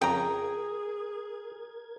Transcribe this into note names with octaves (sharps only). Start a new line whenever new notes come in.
F2 C#3 G#4 A#4 G5 A#5 G#6